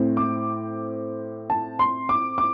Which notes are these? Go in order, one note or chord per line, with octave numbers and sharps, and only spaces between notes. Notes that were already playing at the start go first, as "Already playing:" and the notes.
Already playing: A2 C4
D6
A5
C6
D6
D6